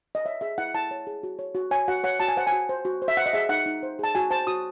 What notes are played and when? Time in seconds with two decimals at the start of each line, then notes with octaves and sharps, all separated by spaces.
0.15 D#5
0.25 C#5 E5
0.41 G#4 E5
0.58 E4 F#5
0.74 E4 A5
0.91 C#5
1.07 G#4
1.23 F#4
1.39 C#5
1.55 F#4
1.71 C#5 G#5
1.88 F#4 F#5
2.04 C#5 F#5
2.20 F#4 A5
2.28 G#5
2.37 C5 F#5
2.47 G#5
2.52 F#4
2.69 C5
2.85 F#4
3.02 C5
3.08 E5
3.17 C5 F#5
3.26 D#5
3.33 G#4 E5
3.49 D#4 F#5
3.66 D#4
3.83 C5
3.99 G#4 A5
4.15 F#4 G#5
4.30 C5 A5
4.47 F#4 D#6